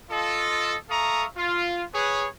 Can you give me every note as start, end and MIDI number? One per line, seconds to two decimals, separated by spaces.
0.10 0.76 65
0.10 0.76 69
0.10 0.76 75
0.89 1.25 69
0.89 1.25 76
0.89 1.25 77
0.89 1.25 82
0.89 1.25 85
0.89 1.25 87
1.37 1.83 65
1.94 2.27 68
1.94 2.27 71
1.94 2.27 73